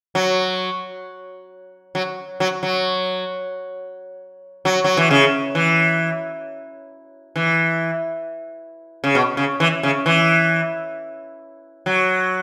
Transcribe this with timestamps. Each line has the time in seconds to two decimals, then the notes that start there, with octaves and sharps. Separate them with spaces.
0.15 F#3
1.95 F#3
2.40 F#3
2.63 F#3
4.65 F#3
4.84 F#3
4.97 E3
5.11 C#3
5.55 E3
7.36 E3
9.04 C#3
9.15 B2
9.37 C#3
9.60 E3
9.83 C#3
10.06 E3
11.86 F#3